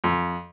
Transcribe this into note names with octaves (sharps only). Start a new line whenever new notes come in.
F2